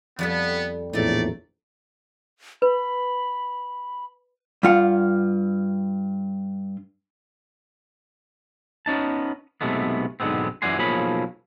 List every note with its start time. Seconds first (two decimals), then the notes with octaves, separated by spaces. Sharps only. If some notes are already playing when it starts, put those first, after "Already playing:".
0.19 F2 G3 B3 A4
0.93 A#1 E2 A2 A3 D#4 A4 D5
2.62 B4 B5
4.63 G2 F4 F#5
8.86 B3 C#4 D#4 A5
9.61 B1 C3 G#3 A3 B3
10.20 B1 G#2 D3 G#3 B3 C4
10.62 F#2 E3 D5 F#5 G#5 C6
10.78 B1 F3 A#3 G#4 C#5 B5